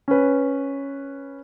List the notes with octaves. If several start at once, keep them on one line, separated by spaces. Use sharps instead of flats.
C#4 B4